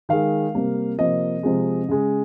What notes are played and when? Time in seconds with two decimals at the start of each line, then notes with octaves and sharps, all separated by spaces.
0.09 D#3 G#3 F5
0.55 C3 G3 A#3
0.98 C3 F3 A#3 D#5
1.43 C3 F3 G#3
1.89 C#3 G#3